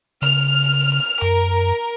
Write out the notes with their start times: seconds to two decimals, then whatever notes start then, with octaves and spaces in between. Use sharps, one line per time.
0.22 C#3 F6
1.22 F#2 A#4